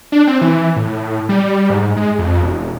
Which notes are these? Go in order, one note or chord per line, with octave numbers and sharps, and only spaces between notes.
D4
C4
E3
A2
G3
G#2
G#3
F2
E1